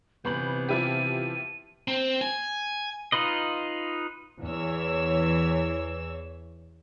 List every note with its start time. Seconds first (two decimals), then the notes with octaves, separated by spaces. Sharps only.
0.25 G1 C3 E3 B3 B5 G6 F#7
0.69 F3 E4 G4 D#7
1.88 C4
2.21 G#5
3.12 D#4 F4 B4 D#5
4.44 E2 E3 C#5 E6